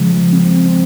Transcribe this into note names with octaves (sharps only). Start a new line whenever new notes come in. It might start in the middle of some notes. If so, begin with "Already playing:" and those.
Already playing: C#3 F3 G#3
C4
C4